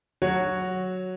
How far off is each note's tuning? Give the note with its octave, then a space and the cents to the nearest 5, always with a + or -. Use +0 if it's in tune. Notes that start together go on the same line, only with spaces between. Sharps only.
F#3 +0 F#4 -5 C#5 +0